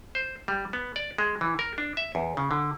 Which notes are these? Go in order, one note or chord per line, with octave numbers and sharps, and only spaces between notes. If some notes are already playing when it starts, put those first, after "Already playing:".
C5
G3
B3
D5
G#3
E3
A#4
D4
E5
E2
C#3
D3